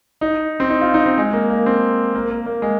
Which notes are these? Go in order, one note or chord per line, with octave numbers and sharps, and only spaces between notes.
D#4
C4
D#4
F4
D#4
C4
G#3
A#3
A#3
C4
A#3
A#3
A#3
G#3